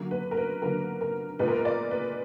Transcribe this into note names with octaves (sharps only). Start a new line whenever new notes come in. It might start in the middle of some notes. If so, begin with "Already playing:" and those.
Already playing: D3 F#3 A#3
B4
A#4
B4
D3 F#3 A#3 A#4
A#4
A#2 G#3 B3 B4
A#4
B4
D5
B4